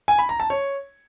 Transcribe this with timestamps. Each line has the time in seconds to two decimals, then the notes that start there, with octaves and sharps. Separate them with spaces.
0.08 G#5
0.19 B5
0.29 A#5
0.40 A5
0.50 C#5